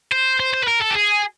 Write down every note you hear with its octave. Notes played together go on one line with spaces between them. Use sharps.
C5
C5
C5
B4
A#4
A4
G4
G#4